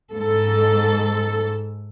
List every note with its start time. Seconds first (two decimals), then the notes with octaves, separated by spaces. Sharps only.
0.13 G#2 A4